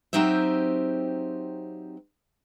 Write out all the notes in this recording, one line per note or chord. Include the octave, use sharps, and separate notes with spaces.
F#3 C4 D#4 G4 C5 E5